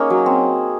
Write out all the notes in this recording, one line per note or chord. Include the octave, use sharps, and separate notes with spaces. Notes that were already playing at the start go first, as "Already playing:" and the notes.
Already playing: A#3 C#4 D#4 G#4 C#5
F#3
C4